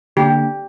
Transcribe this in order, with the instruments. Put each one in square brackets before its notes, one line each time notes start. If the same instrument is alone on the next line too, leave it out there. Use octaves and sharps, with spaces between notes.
[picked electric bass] D3 A#3 D4 [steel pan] G4